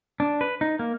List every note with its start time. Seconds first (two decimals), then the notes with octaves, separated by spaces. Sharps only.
0.20 D4
0.41 B4
0.61 D#4
0.79 A#3